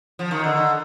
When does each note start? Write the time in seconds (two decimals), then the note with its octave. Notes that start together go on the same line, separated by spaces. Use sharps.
0.19 F3
0.31 D#3
0.44 D3